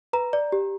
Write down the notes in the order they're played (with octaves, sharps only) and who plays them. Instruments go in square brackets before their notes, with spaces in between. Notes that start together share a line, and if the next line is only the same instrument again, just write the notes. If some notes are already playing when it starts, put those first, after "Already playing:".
[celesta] B4 A#5
D5
G4